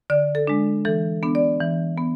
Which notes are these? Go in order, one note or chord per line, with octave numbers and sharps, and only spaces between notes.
D3 D5
A4
G#3 D4
E3 A4
B3 D4
D5
E3
B3